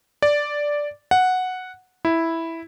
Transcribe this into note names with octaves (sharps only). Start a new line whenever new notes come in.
D5
F#5
E4